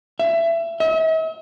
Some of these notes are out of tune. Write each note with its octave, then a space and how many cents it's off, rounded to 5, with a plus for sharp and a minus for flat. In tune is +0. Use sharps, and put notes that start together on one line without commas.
E5 +25
E5 -45